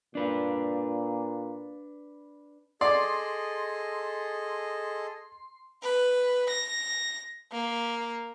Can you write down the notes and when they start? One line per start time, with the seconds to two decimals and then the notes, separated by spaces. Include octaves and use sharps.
0.15 A#2 D4 B4
2.81 G#4 A4 D5 D#5 C6
5.83 B4
6.49 A#6
7.52 A#3